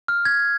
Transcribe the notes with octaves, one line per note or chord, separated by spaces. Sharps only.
F6
G#6